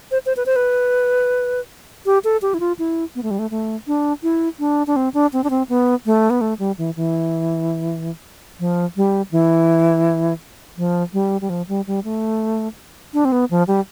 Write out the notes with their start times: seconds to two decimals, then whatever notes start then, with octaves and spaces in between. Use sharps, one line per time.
0.11 C5
0.26 C5
0.37 B4
0.46 C5
0.56 B4
2.06 G4
2.24 A4
2.42 G4
2.54 E4
2.60 F4
2.79 E4
3.15 B3
3.23 A3
3.31 G3
3.39 A3
3.51 A3
3.87 D4
4.23 E4
4.59 D4
4.87 D4
4.96 C4
5.14 D4
5.33 C4
5.44 D4
5.50 C4
5.69 B3
6.06 A3
6.30 B3
6.41 A3
6.59 G3
6.78 E3
6.96 E3
8.60 F3
8.96 G3
9.32 E3
10.77 F3
11.13 G3
11.41 G3
11.50 F3
11.69 G3
11.87 G3
12.04 A3
13.14 D4
13.25 C4
13.32 B3
13.51 F3
13.68 G3